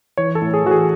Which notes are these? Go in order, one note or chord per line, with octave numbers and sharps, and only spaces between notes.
E3 C#5
A4
A2
G#4
E3 F#4
G#4